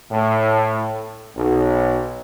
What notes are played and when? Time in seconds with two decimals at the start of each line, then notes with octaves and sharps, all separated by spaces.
0.11 A2
1.36 B1